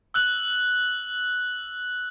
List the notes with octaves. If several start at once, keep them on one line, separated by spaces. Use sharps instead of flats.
E6 F#6 F#7